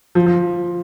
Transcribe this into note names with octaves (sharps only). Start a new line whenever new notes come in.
F3
F3